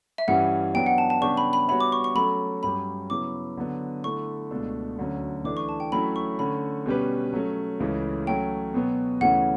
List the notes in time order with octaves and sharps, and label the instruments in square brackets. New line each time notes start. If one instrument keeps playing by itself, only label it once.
[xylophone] E5
[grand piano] G2 E3 G3 C#4 [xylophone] F#5
[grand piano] F#3 B3 D4 [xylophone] G5
[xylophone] F#5
A5
A5
[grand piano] C#3 G3 B3 D4 G4 [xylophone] C#6
[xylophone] B5
B5
[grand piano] G3 B3 F#4 C#5 E5 [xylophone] B5
[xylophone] D6
C#6
C#6
[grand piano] F#3 A3 C#4 F#4 A4 [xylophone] B5
[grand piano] G2 F#3 C#4 G4 [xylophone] B5
[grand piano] C#3 F#3 B3 E4 [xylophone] D6
[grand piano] D3 F#3 B3 D4
[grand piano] D3 A3 E4 [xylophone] C#6
[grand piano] C#2 B2 A3 D4 A4
D2 D3 F#3 C#4
[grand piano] E3 A3 D4 [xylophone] D6
[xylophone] C#6
A5
G5
[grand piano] F#3 A3 C#4 E4 [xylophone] B5
[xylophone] C#6
[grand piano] D3 A3 C#4 [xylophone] B5
[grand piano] B2 G3 C#4 G4 B4
F#3 A3 C#4
C#2 C#3 E3 A3
[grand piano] F#3 A3 C#4 [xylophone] G5
[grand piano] B2 F#3 B3
[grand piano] D2 C#3 E3 A3 C#4 [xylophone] F#5